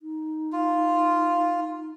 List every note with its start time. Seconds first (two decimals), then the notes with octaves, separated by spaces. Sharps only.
0.02 D#4
0.52 F4